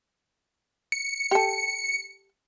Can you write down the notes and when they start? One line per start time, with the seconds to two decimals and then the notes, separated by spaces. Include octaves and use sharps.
0.92 C#7
1.31 G4 A4